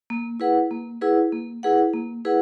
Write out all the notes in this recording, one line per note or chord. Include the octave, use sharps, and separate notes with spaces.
A#3
E4 G#4 B4 F#5
A#3
E4 G#4 B4 F#5
A#3
E4 G#4 B4 F#5
A#3
E4 G#4 B4 F#5